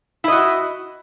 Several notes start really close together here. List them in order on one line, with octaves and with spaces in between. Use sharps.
E4 D#5 F#4